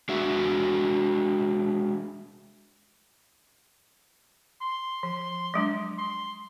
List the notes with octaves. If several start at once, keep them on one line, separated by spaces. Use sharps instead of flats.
G#3 D4 F#4 E5
C6
F3
F#3 G#3 D4
C6